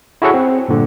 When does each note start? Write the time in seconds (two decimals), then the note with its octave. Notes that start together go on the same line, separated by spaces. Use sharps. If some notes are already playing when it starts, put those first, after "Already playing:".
0.22 E4 F#4 G#4 A4 C#5 F#5
0.34 C4
0.68 G2 A#2 D3